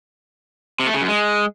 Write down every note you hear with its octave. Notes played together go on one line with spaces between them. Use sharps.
C3
A3
C#3
F#2
G#3